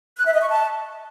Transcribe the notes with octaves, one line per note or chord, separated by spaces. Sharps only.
F#6
E5
D#5
C#6
A5